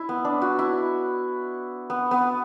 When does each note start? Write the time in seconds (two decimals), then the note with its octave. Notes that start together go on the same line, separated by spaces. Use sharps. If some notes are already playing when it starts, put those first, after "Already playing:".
Already playing: E4
0.09 B3
0.25 D4
0.42 F#4
0.59 E4
1.90 B3
2.11 B3